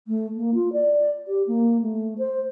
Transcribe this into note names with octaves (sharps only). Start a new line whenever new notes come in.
A3
A#3
F4
D5
G4
A#3
A3
C5